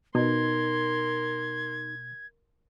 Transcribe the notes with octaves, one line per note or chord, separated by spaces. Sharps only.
B2 D#4 A#4 C6 G#6